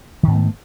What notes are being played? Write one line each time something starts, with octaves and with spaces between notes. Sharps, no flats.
G#2 D#3 A3 B3